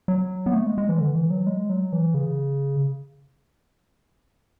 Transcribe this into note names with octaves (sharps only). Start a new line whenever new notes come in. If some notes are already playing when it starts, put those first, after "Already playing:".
F#3
B3
A3
G#3
G#3
E3
D3
E3
F#3
G#3
F#3
E3
C#3